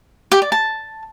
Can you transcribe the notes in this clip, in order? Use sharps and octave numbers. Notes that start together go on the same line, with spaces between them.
G4
D5
A5